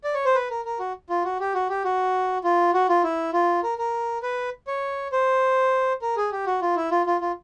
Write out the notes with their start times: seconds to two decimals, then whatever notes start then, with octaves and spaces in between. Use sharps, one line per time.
0.04 D5
0.14 C#5
0.25 C5
0.35 B4
0.50 A#4
0.65 A#4
0.79 F#4
1.10 F4
1.24 F#4
1.40 G4
1.54 F#4
1.69 G4
1.84 F#4
2.44 F4
2.74 F#4
2.89 F4
3.04 E4
3.33 F4
3.63 A#4
3.78 A#4
4.23 B4
4.67 C#5
5.12 C5
6.02 A#4
6.17 G#4
6.32 G4
6.47 F#4
6.62 F4
6.76 E4
6.91 F4
7.06 F4
7.21 F4